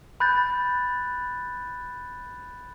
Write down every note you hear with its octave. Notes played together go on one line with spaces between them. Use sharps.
B5 F#6 G6 A6